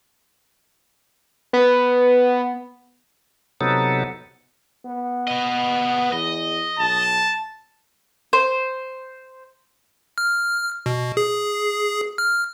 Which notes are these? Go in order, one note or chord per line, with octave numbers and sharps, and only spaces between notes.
B3
C3 F#3 B3 D#4 A4
B3
B4 D#5
E2 D#5
B1 A5
C5
F6
B2
G#4
F6